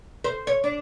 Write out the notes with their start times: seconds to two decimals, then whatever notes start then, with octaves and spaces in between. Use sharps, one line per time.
0.24 C5
0.47 C#5
0.64 D4